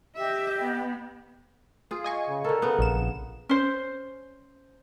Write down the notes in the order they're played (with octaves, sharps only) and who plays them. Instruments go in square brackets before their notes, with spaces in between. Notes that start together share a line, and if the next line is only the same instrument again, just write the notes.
[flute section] G4 D#5 [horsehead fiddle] E5
[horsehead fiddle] B3
[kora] F4 G#4
[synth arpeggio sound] D#5 G#5 C#6
[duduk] C#3
[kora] D3 A4 [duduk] A#4
[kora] C#3 B3
[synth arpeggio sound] A#1 E7
[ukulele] C#4 C5